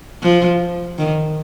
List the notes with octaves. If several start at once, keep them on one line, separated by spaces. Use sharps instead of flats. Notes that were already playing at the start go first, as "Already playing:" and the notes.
F3
D#3